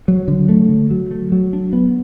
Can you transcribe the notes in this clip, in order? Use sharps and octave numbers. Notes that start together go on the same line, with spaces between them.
F#3
D3
A3
D3
F#3
A3
F#3
D4
B3